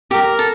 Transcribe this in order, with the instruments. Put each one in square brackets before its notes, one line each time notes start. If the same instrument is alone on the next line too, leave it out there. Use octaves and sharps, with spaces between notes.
[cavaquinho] G4 [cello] A#4
[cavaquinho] A4